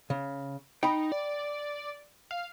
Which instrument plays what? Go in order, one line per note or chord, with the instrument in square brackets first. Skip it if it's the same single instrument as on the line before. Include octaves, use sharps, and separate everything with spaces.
[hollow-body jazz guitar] C#3
[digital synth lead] D#4 [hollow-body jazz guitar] G5 B5
[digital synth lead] D5
F5